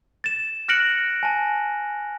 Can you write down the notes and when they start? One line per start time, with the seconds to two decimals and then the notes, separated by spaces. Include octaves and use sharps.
0.24 A6 E7
0.68 F6 F#6 A#6 C#7 D7 F#7
1.23 G#5 A5